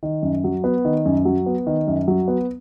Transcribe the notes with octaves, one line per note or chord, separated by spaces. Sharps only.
D#3
F#2
F#3
B3
D#3
F#2
F#3
B3
D#3
F#2
F#3
B3